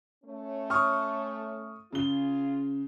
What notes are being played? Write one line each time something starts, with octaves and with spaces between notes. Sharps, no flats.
A3 C#4 C#5
C#6 D#6 F6
C#3 F4 G#4 G7